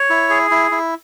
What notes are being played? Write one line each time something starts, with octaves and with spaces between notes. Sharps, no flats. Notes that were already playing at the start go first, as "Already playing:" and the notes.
Already playing: C#5
E4
G#4
E4
E4